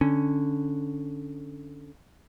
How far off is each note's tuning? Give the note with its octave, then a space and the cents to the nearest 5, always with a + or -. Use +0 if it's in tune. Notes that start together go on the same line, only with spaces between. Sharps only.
D3 +0 C#4 +0